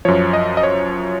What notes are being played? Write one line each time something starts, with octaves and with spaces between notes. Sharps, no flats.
F#2 F3 C#5
D#5
D#5
C#5